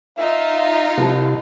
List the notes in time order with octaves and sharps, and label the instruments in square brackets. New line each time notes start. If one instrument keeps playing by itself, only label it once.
[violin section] D#4 F4 [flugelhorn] E5
[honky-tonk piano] C2 F3 A5 [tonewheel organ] C3